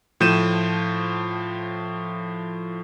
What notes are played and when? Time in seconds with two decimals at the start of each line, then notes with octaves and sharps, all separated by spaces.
0.20 A2 F3 G6 D#7 E7